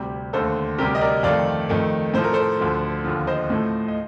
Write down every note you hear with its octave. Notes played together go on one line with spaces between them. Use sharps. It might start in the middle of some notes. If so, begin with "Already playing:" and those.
Already playing: D2 C3 G3
D#2 D3 A3 A4 C5
D2 C3 G3 G4 A#4
D#5
A#4 D5
F2 D#3 A3 D5 F5
F2 D#3 A3
A2 F3 A3 C5
A#4
A4 C5
D2 D3 F3 A3
D#2 D3 F3
C5 D#5
A2 F3 A3
D#5